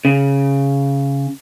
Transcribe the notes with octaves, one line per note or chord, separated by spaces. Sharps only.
C#3